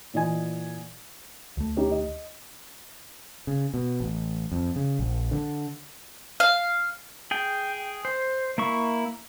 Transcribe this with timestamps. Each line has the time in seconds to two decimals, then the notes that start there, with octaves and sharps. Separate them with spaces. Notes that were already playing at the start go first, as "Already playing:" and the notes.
0.14 A#2 E3 D#5 G#5
1.57 D2 A3
1.76 D#4 G4 C#5
1.91 D#5
3.47 C#3
3.74 B2
4.00 A1
4.52 F2
4.76 C#3
4.99 A#1
5.31 D3
6.40 F5
7.31 G#4 G5
8.05 C5
8.58 A#3 E4 C#6